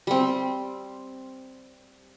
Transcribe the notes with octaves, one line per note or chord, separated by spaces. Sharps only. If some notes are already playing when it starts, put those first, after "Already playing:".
G3 C4